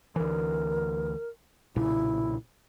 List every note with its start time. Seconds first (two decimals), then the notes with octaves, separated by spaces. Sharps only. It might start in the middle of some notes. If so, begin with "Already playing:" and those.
0.16 D2 E3 A#4
1.76 B1 A#2 C#3 E4